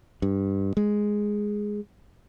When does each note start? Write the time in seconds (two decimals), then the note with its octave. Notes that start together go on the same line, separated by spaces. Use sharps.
0.22 G2
0.77 G#3